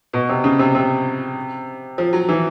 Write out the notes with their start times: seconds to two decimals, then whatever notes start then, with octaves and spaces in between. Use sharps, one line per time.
0.13 B2
0.29 C3
0.44 C#3
0.59 C3
0.75 C3
1.98 F3
2.13 F#3
2.29 E3